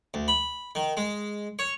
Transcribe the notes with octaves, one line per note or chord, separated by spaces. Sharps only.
D2
B5
D#3
G#3
C#5